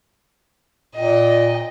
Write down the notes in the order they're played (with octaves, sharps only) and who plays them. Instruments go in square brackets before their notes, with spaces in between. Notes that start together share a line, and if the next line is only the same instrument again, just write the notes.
[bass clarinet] A#2 [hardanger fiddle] D#5 G5